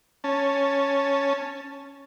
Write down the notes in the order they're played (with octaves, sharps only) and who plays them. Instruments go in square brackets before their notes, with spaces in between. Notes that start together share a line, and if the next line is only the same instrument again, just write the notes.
[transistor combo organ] C#4 A5